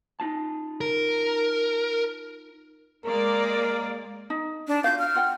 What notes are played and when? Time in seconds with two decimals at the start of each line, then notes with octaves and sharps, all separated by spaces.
0.20 D#4 F4 A5
0.81 A#4
3.05 G#3 A#3 A#4 D5
4.30 D#4
4.68 D4
4.84 F4 F#4 F5 G6
4.99 F6
5.15 F4 F#5 G5